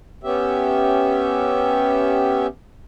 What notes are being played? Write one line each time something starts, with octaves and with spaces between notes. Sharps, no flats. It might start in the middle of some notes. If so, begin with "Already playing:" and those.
B3 C#4 G4 E5